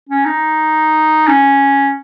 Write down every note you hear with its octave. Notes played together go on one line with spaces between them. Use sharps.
C#4
D#4
C#4